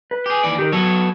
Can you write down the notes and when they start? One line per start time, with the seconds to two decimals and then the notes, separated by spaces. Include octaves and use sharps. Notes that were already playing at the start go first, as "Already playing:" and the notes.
0.11 B4
0.26 G4 G#4
0.43 D#2 E3 D5
0.59 D#3 G4 A#4
0.72 F#3 B3 A4 C#5